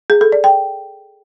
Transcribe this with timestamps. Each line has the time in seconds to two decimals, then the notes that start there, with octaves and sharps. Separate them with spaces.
0.10 G#4
0.21 A4
0.32 D5
0.44 G5